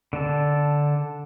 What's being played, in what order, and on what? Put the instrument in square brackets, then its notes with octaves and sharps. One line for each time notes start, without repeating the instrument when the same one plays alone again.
[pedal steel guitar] D3 A5